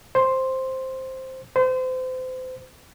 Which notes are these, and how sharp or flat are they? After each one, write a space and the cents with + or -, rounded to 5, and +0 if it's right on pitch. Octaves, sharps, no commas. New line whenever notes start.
C5 +5
C5 -30